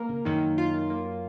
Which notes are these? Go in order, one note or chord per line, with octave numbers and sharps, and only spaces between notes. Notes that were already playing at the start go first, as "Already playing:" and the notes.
Already playing: A#3 A#4
C#3
F#2 D#3
F4
A#3